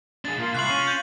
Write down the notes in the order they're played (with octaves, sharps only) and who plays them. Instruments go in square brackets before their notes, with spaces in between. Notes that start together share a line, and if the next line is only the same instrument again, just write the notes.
[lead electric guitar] D4 G#4 [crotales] A6
[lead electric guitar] A#2 A#3 [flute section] F4
[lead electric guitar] C2 [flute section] F4 F5 C#6 [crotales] F#6 C7 F#7
[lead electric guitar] C#4
[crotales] G6